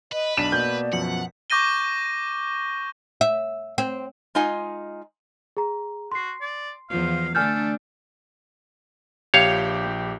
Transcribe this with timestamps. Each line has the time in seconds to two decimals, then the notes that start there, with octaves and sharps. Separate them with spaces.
0.12 B4 D#5
0.37 B1 D4 D5 B6 E7
0.52 B2 A#3 G6
0.93 F#2 B2 F3 F#5
1.50 C#6 D6 G6 A#6 D#7 G7
3.21 E5
3.78 C4
4.35 G#3 D#4 F4 D#5 G#5
5.57 G#4 A#5
6.12 F#4 C6 C7
6.41 D5
6.90 E2 F3 F5
7.35 D3 A3 D4 A4 G#5 F6 G6
9.34 A#1 G4 C#5 F5 G6